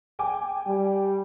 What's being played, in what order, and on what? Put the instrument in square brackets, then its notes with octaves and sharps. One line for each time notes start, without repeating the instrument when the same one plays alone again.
[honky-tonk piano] G5 G#5 D6
[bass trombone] G3